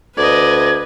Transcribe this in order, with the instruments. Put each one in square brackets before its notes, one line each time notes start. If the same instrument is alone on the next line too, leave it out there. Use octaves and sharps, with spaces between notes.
[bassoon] D2 [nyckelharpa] B4 [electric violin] D5 D#5 [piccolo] G#6